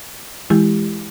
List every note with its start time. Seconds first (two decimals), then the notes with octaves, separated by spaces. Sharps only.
0.50 E3 G#3 E4 G4